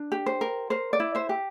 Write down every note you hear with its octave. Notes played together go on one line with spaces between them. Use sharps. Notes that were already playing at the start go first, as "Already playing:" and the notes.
Already playing: D4
G4
C5
A#4
A#4 C5
D5
E4
C5 E5
G4